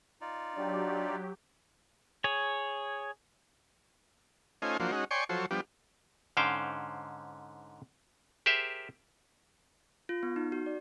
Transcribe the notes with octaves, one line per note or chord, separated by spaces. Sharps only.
D#4 F4 D5
F#3 D4 G4
G#4 C#5
A3 C#4 D#4 F4 C5 G#5
F3 F#3 A#3 D4 C5
G#3 C#4 D#4 F#4
C#5 D5 G5 G#5 C6 C#6
F3 F#3 A4 C5 C#5
F3 G3 B3 D4 G4
G#2 D3 C#4 C5 F5 G5
G4 G#4 A#4 C5 E5
F4
B3
D#4
F#4
D5